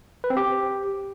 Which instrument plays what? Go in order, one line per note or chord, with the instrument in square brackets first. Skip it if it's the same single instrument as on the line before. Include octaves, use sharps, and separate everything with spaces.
[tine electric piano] B4
C4
G4